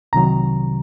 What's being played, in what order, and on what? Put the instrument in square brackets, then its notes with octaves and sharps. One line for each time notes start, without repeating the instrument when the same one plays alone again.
[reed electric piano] C2 C3 D#3 F#3 A#5